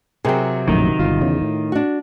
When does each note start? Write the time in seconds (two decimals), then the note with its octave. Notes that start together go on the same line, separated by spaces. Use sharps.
0.25 C3 F#3 G#4 A#4 G5
0.67 A#1 F#2 A2 D#3
0.99 G1 F4
1.21 E2 C#3
1.42 A2
1.72 D4 F#4